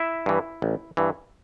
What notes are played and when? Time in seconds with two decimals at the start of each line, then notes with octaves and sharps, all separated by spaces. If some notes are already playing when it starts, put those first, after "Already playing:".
Already playing: E4 E5
0.26 G2 E3
0.62 A1
0.97 G2 E3